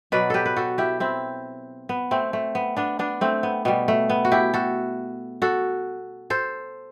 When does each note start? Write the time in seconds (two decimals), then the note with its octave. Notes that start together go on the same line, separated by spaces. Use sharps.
0.12 B2 F#3 B4 D5
0.30 G4 A4 B4
0.45 B4
0.56 F#4 A4
0.78 E4 G4
1.00 C4 E4
1.89 B3
2.11 A3 C4
2.33 A3
2.55 B3
2.77 B3 D4
2.99 B3 D4
3.21 A3 C4
3.43 B3
3.65 B2 G3 B3
3.88 A3
4.10 B3
4.25 F#4
4.31 E4 G4
4.54 F#4 A4
5.42 F#4 A4
6.30 A4 C5